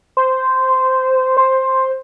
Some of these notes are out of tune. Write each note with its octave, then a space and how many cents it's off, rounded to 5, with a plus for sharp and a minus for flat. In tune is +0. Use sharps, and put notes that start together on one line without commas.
C5 -10
C5 +10